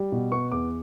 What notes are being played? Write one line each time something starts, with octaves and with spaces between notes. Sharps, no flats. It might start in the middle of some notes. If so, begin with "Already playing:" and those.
Already playing: G3
B2
B3 C#6
E2 D6